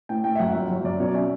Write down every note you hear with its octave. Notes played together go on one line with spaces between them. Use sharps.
A2 G5
A2 G5
E5
F#2 F#5
G1 E5
F#3
F#2 D5
B2 C#5
D5
C#4 E5